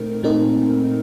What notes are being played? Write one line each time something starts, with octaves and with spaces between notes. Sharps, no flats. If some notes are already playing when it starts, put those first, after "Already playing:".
Already playing: A#2 A3 C4 D#4 A#4
A#2 A3 C4 D#4 A#4